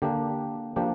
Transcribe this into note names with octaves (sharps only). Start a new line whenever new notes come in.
D3 A#3 D4 G4
F3 A#3 D4 G4